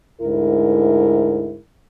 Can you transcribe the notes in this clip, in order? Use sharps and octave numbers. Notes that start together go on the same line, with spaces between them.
D2 G#2 E4 A#4